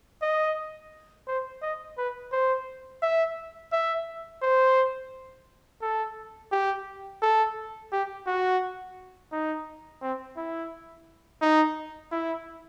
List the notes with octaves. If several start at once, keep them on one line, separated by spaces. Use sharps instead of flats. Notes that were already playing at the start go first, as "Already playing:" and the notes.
D#5
C5
D#5
B4
C5
E5
E5
C5
A4
G4
A4
G4
F#4
D#4
C4
E4
D#4
E4